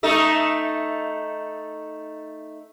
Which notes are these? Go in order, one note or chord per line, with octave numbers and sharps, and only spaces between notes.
A3 D#4 A4